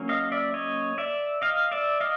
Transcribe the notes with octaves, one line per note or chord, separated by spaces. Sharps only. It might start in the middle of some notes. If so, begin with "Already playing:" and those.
Already playing: F#3 A#3 C#4
D#5 F5
D5 E5
C#5 D#5
D5 E5
D#5 F5
D5 E5
D#5 F5